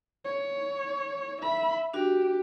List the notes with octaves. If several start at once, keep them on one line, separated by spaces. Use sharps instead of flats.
C#5
E5 B5
D4 F#4 G4